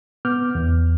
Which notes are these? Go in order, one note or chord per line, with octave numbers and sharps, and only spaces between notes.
B3 D6 F6 G6
E2